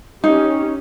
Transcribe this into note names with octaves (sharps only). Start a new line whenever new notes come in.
C#4 D#4 G4